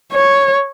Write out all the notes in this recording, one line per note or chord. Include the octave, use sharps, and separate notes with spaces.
C#5